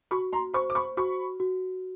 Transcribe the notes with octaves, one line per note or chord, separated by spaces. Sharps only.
F#4 B5 C#6
A#5 C6
C5 B5 C#6
D6
B5 C#6
F#4 B5 C#6
F#4